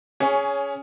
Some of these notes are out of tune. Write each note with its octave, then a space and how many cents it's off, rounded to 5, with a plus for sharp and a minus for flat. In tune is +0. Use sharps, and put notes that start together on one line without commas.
C#4 +15 G#4 +0 C#5 +0